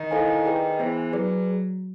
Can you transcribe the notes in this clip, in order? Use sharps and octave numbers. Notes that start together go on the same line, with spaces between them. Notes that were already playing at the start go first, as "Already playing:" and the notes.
Already playing: D#3
E4 A4 C5 F5 G#5
G#4 B4 D5 G5
E3 B3 E4 G#4 C5
F#3 G#4 B4 D5